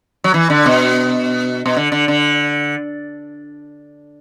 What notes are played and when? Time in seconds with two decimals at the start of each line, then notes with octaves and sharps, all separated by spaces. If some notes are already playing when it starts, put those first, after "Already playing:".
0.24 F#3
0.34 E3
0.50 D3
0.66 B2
1.66 B2
1.76 D3
1.92 D3
2.08 D3